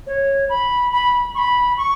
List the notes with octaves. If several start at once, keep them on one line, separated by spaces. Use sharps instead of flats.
C#5
B5
B5
C#6
B5
C#6